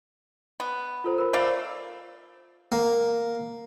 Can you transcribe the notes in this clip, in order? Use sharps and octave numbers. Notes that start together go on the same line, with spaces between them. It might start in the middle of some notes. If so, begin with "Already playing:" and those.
B3
F4 A4 C5
A#4 B5
A3 C5 D5 F5 A#5 B5
A#3